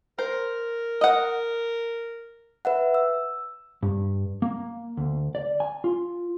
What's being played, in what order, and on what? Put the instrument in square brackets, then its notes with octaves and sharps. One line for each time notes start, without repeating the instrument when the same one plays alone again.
[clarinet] A#4 [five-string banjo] C5
[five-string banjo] D#5 F#5
[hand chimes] B4 E5 F#5
E6
[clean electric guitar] G2
A#3
D2
D5
G#5
F4